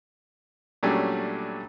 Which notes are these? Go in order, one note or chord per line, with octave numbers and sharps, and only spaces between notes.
A#2 F#3 G3 A3 C#4 D4